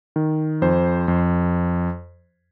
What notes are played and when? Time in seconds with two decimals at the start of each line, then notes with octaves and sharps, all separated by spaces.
0.16 D#3
0.62 F2 C5
1.08 F2